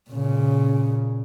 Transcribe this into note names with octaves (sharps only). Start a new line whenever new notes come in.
A#2 C#3